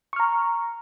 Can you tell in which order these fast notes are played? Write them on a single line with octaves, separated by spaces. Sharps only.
C#6 F6 A#5